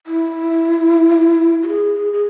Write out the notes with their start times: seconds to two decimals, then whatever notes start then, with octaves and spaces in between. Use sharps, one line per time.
0.07 E4
1.63 F#4
1.68 G#4
1.94 G#4
2.13 G#4